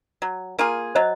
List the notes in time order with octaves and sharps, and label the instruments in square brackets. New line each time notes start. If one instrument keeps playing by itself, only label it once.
[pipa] F#3
A#3 F4 G#4
[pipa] F#3 [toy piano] C5 D#5